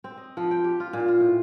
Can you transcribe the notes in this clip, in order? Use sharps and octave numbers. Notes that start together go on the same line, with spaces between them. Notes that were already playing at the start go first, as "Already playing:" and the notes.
C4
D#5
F3
G5
G4
F4
A#2
F4
A2